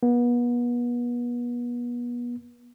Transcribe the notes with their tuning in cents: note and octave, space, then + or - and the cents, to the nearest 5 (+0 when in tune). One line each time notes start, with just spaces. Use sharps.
B3 -35